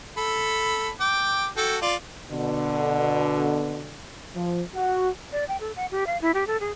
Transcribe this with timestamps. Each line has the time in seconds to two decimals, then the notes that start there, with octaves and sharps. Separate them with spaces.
0.17 A4 B5
1.00 G5 D6
1.57 F#4 A4 G5
1.82 F4 D5
2.30 B2 D3
4.35 F3
4.75 F#4
5.32 D5
5.48 G5
5.60 A4
5.76 F#5
5.91 G4
6.07 F5
6.21 E4
6.34 G4
6.47 A4
6.61 G#4